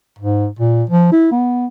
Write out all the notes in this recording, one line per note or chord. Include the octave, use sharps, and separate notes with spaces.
G#2
A#2
F3
E4
B3